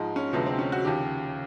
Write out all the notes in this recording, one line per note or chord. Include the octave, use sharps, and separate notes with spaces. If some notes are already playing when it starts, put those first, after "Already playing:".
Already playing: G#2 F3 G#3
C#4
D2 C3 F3 G#3 B3
C4
C#4
F#4
D#2 C#3 F3 G4